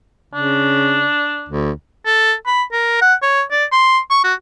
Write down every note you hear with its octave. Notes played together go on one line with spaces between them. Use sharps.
C#3 D4
D2
A4
B5
A#4
F#5
C#5
D5
C6
C#6
F#4